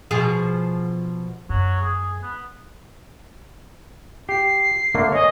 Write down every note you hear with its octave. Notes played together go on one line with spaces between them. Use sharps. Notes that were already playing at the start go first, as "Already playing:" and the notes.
B2 F3 G#4
F#2 F#3
G#4
B3
G4 C7
D3 A3 A#3
C#5 D#5 G#5